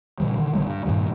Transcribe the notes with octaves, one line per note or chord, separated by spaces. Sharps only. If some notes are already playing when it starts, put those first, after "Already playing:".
A#2 C#3 E3 G3
D3 D#3
A#1 D3 G3 G#3
G2
G2 A#2 D#3 G3